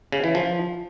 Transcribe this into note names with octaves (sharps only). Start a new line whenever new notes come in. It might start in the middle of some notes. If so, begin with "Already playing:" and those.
C#3
E3
F3